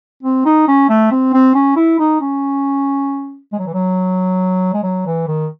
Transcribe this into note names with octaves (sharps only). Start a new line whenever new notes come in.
C4
D#4
C#4
A3
C4
C4
C#4
E4
D#4
C#4
G#3
F#3
E3
F#3
G#3
F#3
E3
D#3